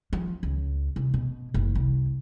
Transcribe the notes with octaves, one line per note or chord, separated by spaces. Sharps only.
F3
C#2
C2
B2
F#1
C2